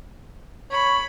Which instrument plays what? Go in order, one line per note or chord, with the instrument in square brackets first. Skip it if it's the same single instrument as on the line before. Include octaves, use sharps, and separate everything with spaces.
[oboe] C#5 [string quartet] B5